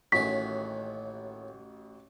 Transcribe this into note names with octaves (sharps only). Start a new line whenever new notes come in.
A1 D#2 A2 F#4 G#5 C#6 B6